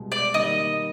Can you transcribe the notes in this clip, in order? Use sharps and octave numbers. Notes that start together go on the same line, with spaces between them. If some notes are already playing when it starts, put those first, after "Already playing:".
Already playing: C2 B2 G#3
D5
D#3 G3 A#3 D#5